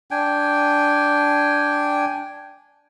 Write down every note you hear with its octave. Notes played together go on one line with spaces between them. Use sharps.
D4 G5 G#5